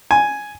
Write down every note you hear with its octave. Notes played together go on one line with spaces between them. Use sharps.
G#5